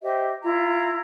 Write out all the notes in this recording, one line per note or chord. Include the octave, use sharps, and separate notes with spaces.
G4 C5 D#5 E5
E4 F4 A#5